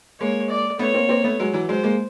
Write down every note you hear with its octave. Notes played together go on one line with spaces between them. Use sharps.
G#3 A#3 C#5
D5
A3 B3 C#5
A#3 C4
A#3 C4
A3 B3
F#3 G#3
E3 F#3
F#3 G#3 C5
G#3 A#3